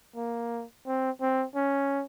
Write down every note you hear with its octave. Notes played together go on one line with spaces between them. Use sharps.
A#3
C4
C4
C#4